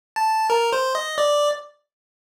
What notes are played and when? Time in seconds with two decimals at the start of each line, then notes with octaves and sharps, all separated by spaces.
0.16 A5
0.50 A#4
0.73 C5
0.95 D#5
1.18 D5